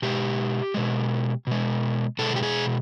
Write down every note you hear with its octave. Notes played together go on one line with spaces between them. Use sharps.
B2 G#3 G4
B2 G#3
B2 G#3
B2 G#3 A4
G4
G#4